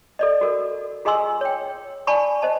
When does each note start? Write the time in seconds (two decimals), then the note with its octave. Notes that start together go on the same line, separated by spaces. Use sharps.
0.19 A4 D5 D#5
0.41 F#4 A4 A#4
1.05 F4 G#4 D#5 G#5 C6 E6
1.41 C#5 G5
2.07 D5 G#5 A5 B5 C#6
2.42 C5 D#5 A5